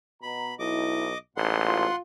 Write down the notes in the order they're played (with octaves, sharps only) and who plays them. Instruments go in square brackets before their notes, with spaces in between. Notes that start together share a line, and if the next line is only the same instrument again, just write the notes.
[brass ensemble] B2 A#5 [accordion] B5
[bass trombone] B1 [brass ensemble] E4 [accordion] D#5 D6
[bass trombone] A1 [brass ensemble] G#2 [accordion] F#5 C6
[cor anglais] F4